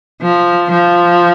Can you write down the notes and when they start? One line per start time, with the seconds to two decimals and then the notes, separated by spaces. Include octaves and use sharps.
0.22 F3
0.71 F3